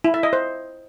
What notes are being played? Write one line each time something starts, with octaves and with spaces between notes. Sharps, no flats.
E4
E5
D#5
C5